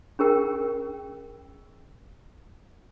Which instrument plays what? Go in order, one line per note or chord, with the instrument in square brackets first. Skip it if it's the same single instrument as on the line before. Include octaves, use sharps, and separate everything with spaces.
[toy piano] C#4 G#4 A#4 G5